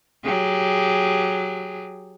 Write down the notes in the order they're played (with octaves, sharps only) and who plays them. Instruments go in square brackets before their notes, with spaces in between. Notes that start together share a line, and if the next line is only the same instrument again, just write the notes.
[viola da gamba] F#3 G4 G#4